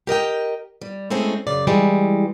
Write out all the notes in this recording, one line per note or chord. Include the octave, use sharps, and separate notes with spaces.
G4 A#4 D#5 G5
G3
G#3 A3 C4 C#4 E4
F#2 C#3 D5
E3 G3 G#3